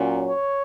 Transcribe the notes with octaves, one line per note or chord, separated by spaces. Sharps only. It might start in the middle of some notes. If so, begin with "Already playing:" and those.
Already playing: A#2 F#3 C#4
C#5